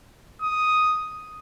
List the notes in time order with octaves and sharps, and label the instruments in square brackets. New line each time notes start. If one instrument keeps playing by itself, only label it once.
[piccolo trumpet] D#6